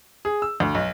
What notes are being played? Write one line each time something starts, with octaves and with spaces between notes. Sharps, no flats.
G#4
E6
D2
B1